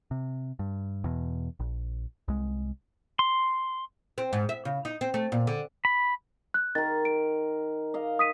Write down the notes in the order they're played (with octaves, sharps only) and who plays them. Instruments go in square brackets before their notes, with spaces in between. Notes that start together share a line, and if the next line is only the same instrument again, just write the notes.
[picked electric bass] C3
G2
E2 B2
A#1
C2 G#3
[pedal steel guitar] C6
[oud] C4
G#2
E5
C#3
D#4
C4
A3
A#2
D3
[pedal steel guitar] B5
[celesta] F#6
[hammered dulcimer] D#3 A#4 [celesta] A6
[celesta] D7
[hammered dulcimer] D#5 F5
[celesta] D#6 B6 D#7